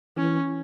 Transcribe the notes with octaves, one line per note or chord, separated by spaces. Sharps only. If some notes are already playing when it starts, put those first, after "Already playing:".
E3 C#4